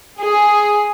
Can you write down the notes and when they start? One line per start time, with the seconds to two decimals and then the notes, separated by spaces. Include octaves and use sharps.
0.18 G#4